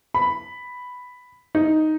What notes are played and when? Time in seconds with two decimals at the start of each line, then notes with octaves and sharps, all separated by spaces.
0.14 B5
1.55 D#4